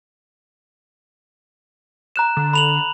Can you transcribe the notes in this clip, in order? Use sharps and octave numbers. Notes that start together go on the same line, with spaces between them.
A#5 F#6 E7
D3
B5 F7 F#7